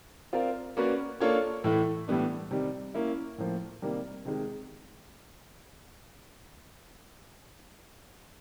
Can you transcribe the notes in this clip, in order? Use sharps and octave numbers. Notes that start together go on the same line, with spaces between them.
C4 F4 A#4 D5 F5
A#3 C#4 F#4 B4 D5
A#3 D4 F4 A4 C#5
A2 E3 A3
A2 E3 G3 B3 D4
C3 D#3 G3
A#3 C#4 E4
A2 F3 A#3
C3 D#3 G3 A#3
C3 D#3 G#3